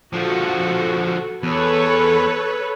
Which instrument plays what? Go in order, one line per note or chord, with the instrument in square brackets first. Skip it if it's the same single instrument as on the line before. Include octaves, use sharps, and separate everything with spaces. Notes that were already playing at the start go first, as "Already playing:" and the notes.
[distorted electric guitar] D3 F3 [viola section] F#4 A4
[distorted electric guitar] E2 [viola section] A4 B4 C#5